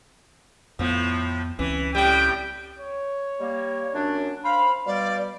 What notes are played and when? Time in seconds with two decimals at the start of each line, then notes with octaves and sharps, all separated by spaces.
0.79 F2 A2 F3 B3
1.59 C#2 E3 C4 C#4
1.95 A2 G3 G5
2.79 C#5
3.40 G3 A#3
3.94 F#2 D4
4.44 C5 F5 B5
4.86 B2 G3 D5 F5